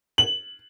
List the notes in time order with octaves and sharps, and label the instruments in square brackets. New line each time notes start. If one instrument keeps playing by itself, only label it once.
[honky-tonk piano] F#7